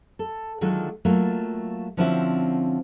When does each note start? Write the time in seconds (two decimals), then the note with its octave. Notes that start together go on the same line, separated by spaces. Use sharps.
0.19 A4
0.61 D3 D#3 F#3 G#3 F4 A4
1.05 F#3 A3 A#3 F4
1.97 D3 F3 C4 C#4 E4 F#4